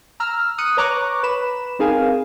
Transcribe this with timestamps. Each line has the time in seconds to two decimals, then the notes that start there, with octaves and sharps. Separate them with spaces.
0.20 A#5 E6 F6
0.58 D#6 F#6 C#7 D#7
0.77 B4 C#5 A#5 C#6 D6 F#6
1.23 B4 B5 E7
1.79 C4 D#4 G#4 A#4 F5 G#5